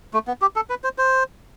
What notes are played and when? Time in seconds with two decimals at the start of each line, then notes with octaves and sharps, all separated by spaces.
0.14 A3
0.28 B3
0.42 G4
0.56 A4
0.70 B4
0.84 C5
0.98 C5